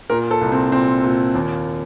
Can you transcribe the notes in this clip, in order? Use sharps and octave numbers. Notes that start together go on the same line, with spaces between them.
A#2 A#4
A4
C2
C4
A#2 C4
A#2
D#2